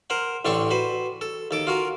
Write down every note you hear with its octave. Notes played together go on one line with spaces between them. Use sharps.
A#4 C5 F#5
A1 D3 C4 D4 A4 C#6
F#4 B4 C5
A4
D#2 A4 D6
F4 F#4 A#4